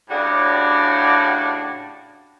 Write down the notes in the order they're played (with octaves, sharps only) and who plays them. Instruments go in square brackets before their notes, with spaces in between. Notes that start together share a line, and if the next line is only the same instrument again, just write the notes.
[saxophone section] A2 C#3 D4 F#4 G4 D5